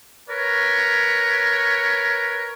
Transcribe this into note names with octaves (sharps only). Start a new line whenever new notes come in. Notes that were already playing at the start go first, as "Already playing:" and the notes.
A#4 B4 C#5